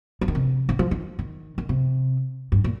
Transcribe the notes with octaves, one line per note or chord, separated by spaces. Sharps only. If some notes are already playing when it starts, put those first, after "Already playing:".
F3
D#3
C3
D#3
F3
D#3
D#3
D#3
C3
G2
A#2